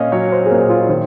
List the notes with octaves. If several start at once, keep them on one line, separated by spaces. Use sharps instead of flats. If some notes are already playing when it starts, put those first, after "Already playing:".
Already playing: A#2 C#4 D#5 F5
F#3 C#5
C5
G#4
A#2 A#4
F4
D#3 C5